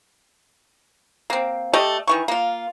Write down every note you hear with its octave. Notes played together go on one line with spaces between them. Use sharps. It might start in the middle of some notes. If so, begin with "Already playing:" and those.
A#3 C4
A3 G4 D5 D#5
D#3 E3 C#6
A#3 F4